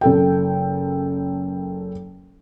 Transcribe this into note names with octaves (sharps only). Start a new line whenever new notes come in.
F#1 A4 G5